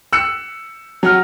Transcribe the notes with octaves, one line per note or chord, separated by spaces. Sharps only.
E6 F#6 C#7
F#3 F#5 F6